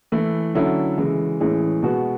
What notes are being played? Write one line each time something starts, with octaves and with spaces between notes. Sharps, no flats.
E3 A3 E4
D3 F#3 C#4 E4 A4
C#3 E3 G#3
A2 E3 G#3 C#4 G#4
B2 G#3 B3 F#4